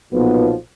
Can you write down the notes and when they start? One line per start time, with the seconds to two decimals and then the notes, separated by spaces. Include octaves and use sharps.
0.11 B1 A#2 F3 B3